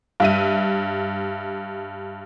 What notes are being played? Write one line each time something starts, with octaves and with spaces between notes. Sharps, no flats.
G2 E5 D#7